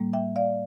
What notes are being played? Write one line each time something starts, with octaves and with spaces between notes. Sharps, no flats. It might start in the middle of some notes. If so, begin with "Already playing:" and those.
Already playing: A2 G3 A#3
E5 G5
D5 F5